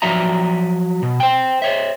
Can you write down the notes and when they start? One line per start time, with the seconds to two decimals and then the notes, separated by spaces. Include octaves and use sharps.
0.02 F3 F#3 F#4 D5 E5 A#5
1.03 B2
1.20 C5 G5
1.62 C5 C#5 E5